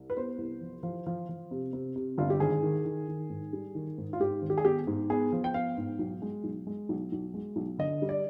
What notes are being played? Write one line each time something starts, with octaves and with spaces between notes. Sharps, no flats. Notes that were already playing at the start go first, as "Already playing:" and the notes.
Already playing: C2
B4
B3 C5
C2
F3
F3
F3
F3
C3
C3
C3
G1 F4
G4
G#1 G#4
D#3
D#3
D#3
G#2
G3
D#3
G#2
F4
G#2 G4
G#1
G4
G#4
B3 G4
G#2
B3 G#4
F3
G5
B3 F5
G#2
B1
G#3
B1
G#3
B1
B1
G#3
B1
D3 D#5
G3
D5